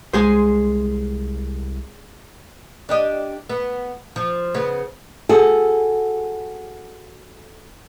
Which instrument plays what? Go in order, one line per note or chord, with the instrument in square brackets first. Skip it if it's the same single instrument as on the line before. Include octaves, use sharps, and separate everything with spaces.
[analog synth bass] C2 [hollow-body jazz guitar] G#3 G#4 C5
[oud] D4 G4 D#5
B3
F3
C#3 B3
[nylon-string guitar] F#4 G#4 A4